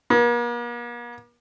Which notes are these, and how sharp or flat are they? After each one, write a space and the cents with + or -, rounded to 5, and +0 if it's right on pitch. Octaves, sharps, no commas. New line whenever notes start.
A#3 +45